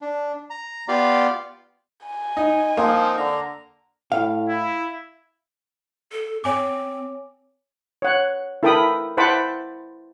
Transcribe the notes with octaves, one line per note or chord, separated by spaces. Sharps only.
D4
A#5
B3 F4 G4 D5 F5
G#5
D#4
F3 A#3 C4 D#4
D3 A#5
A2 F5
E4
A4
C4 C#5 G#5 D6
C#5 F#5
E4 A4 A#4 G5 B5 D#6
E4 C5 F#5 A5 B5 D6